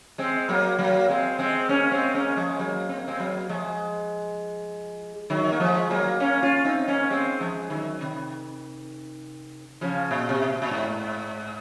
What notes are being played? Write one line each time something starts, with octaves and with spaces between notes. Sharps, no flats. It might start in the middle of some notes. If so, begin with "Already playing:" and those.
G#3 C4
F#3 A#3
F#3 A#3
G#3 C4
G#3 C4
A#3 C#4
G#3 C4
A#3 C#4
F3 G#3
F#3 A#3
C4
A#3
G#3 C4
F#3 A#3
F3 G#3
D#3 F#3
A#3
F3 G#3
F#3 A#3
A#3 C#4
C#4 F4
C4 D#4
A#3 C#4
G#3 C4
F3 G#3
D#3 F#3
C3 D#3
C#3 F3
A#2
C3
A#2
A#2
G#2